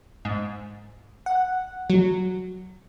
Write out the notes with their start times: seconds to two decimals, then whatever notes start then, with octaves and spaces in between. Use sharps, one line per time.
0.25 G#2
1.26 F#5
1.90 F#3